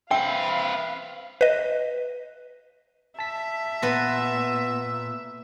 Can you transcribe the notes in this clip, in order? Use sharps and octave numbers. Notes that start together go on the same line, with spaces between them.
C4 B4 E5 F5 G5
B4 D#5
E5 A5 B6
A#2 B3 A4 B4 C6 A#6